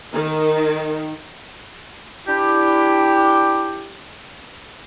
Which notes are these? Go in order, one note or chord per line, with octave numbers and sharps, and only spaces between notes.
D#3
D4 E4 G4